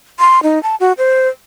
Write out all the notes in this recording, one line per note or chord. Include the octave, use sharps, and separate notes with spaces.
C6
D#4
A5
F#4
C5